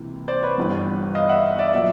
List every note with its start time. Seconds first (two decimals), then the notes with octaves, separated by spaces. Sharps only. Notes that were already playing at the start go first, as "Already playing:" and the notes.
Already playing: C#2 C3 E3 A#3
0.28 C5 D5
0.43 B4 C#5
0.57 G1 G2 E3 G3 B3
1.15 D#5 F5
1.29 E5 F#5
1.59 D5 E5
1.73 A#2 F#3 D5 E5